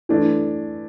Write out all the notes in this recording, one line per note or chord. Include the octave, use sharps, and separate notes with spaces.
E3 A3 D4